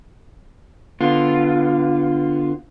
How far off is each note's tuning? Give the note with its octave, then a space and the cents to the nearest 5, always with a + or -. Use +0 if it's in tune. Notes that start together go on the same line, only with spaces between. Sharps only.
D3 +0 B3 +0 F4 +0